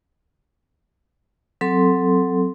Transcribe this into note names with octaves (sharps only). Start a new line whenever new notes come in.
F#3 C4 A4 C6